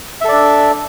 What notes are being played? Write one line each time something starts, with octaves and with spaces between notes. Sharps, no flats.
D4 A4 D5 E5